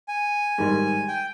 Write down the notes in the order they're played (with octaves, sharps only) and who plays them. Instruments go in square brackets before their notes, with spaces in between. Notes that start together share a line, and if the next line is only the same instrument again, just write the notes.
[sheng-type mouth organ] G#5
[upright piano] G#2 D#3 G3
[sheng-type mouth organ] G5